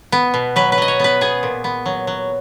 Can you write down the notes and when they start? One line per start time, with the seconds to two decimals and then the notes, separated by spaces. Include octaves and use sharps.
0.12 B3
0.34 B2
0.56 F#3 B4
0.72 B4
0.78 F#3 D#5
0.88 C#5
1.00 B3 B4
1.21 B3 G#4
1.43 A#2
1.64 B3
1.86 F#3
2.07 F#3